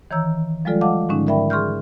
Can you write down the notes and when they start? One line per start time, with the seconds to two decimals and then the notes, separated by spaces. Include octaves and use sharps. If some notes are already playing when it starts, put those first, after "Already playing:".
0.11 D#3 E3 C#5 A#5 E6 G6
0.65 F3 G3 G#3 F4 A4 D5
0.81 D#5 F5 F#5 A5 D6
1.09 G#2 D3 D#3 G#3 C#4 D#4
1.27 A#4 D5 E5 G5 B5
1.50 G#4 C6 C#6 F6 G6